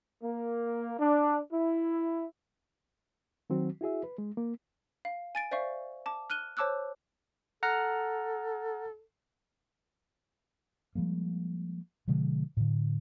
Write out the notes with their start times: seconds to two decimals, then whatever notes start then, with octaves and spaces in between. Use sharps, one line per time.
0.23 A#3
0.99 D4
1.53 E4
3.50 D#3 F#3 C4 F#4
3.81 E4 F#4 G#4 E5
4.04 B4
4.18 G#3
4.37 A#3
5.05 F5
5.35 G#5 A6 D7
5.51 C5 D5 E5 F5 C#6
6.06 A5 D6
6.30 F6 F#6 D#7 G7
6.57 C5 C#5 A5 D6 E6 F#6
7.63 A4 F#5 A#5 F6
10.95 F3 G3 G#3 A#3
12.08 B2 D3 F3 G#3
12.57 A2 D3